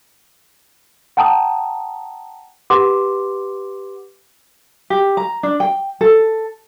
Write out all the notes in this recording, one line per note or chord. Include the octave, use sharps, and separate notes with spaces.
F#5 G5 A5 A#5 D#6
G4 B4 F#5 C6 D6
G4
A#5
D4
G5
A4